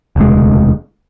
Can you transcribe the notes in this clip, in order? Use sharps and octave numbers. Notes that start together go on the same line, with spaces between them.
E1 D2 C3 G#3